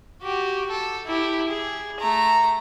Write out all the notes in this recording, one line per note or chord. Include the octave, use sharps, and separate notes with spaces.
F#4 G4
A4
E4 G4
G#4
A3 A#5